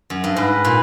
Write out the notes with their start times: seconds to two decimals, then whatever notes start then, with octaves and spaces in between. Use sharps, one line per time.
0.10 F#2
0.24 G2
0.36 G#2 B4
0.65 A#2